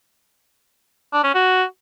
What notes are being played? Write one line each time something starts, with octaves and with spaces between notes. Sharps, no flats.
D4
C#4
F#4